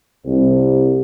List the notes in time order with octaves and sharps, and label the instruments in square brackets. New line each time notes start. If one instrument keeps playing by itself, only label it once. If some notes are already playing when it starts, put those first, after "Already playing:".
[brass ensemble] C2